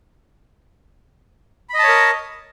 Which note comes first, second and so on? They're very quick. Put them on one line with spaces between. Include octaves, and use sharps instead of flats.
B5 D#5 A5 C#5 A#4